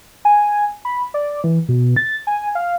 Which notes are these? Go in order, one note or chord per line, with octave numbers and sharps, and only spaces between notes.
G#5
B5
D5
E3
B2
A6
G#5
F5